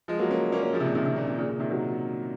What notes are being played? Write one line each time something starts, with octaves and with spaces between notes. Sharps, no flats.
F3 G#3
F#3 A#3
A#3 C#4
A#3 C#4
A#3 C#4
C#3 F3
C3
A#2 C#3
C3 D#3
C3
A#2
C3
A#2 C#3
A#2 C#3
C3 D#3
D#3 F#3